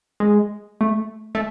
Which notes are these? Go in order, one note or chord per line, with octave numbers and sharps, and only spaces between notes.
G#3
A3
A3